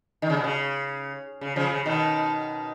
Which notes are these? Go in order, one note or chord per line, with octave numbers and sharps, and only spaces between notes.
D#3
C#3
B2
C#3
C#3
C#3 F3
C#3
B2 D#3